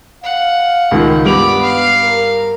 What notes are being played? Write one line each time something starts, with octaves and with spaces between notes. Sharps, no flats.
F5 F#5
C#2 D#3 F4
G2 G3 B3 B5 D6 F7
F5
A#4